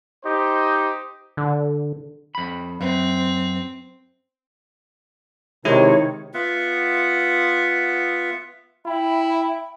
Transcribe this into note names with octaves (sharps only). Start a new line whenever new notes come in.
D#4 G4 C5 D#5
D3
F2 B5
F#2 C4
C3 D#3 G#3 E4 C#5
B3 F4 E5 F#5
E4 E5 G5 B5